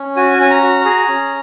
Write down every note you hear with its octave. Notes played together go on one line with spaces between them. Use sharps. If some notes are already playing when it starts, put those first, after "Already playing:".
Already playing: C#4
F#4 G#5
C#4 G#5
A#5
F#4
G#4
C#4